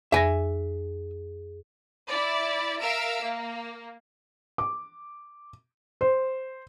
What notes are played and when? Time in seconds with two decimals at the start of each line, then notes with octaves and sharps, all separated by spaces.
0.12 F2 G#4 E5 G#5 A#6
2.07 E4 D5
2.79 A#4 E5 F5 E6 D7
3.22 A#3
4.58 D6
6.01 C5